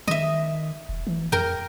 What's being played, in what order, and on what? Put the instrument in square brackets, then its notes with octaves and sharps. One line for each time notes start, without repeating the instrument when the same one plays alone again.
[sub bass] D#3 [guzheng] D#5 E5
[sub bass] E1
E3
[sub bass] F2 [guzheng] A#4 G5